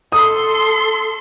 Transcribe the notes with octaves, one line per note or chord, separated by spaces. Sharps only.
A4 C6 D#6